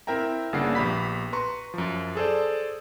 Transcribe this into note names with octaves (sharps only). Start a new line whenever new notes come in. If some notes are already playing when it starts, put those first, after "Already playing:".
C4 E4 A#4 E5 G5 A#5
G1 C#3 A#3 D4 F#5 C7
A#1 B3 G4 B5 B6
B4 A#5 C6 C#6
F#2 F3
G#4 A4 C5 D5